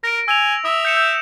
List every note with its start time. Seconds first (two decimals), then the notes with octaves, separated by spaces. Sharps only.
0.04 A#4 A#6 D7
0.28 G#5 E6 F7
0.65 E5 D#6
0.85 G6 C#7 E7
0.97 G6